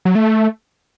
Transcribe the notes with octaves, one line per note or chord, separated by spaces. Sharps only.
F#3
A3